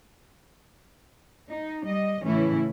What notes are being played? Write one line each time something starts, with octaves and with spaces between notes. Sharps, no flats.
D#4
G3 D#5
A2 C#3 E3 C#4 E4